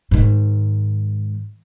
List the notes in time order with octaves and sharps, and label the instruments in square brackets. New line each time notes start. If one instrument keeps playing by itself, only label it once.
[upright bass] G#2 D#3